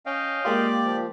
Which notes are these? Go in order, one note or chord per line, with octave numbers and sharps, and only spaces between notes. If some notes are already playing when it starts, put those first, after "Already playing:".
C#4 D#5 F5 G5
G#3 A#3 F4 G4 D5
F3